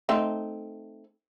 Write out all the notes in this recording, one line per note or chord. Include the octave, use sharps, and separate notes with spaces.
A3 C4 D#4